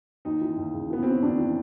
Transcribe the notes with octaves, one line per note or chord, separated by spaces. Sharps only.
D#2 D#4
E3
D#2
C#3
E3 B3
E3 C4
C#4
D#2 D4
E3